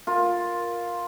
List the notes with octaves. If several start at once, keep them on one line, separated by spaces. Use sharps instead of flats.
F4 A#4